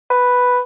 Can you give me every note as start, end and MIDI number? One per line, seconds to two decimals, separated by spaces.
0.10 0.59 71